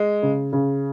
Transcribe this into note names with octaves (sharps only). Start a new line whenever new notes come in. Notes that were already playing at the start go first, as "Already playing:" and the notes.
Already playing: G#3
C#3
C#3